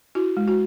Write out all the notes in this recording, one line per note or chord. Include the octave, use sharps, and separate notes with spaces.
E4 F#4
G#3
F#4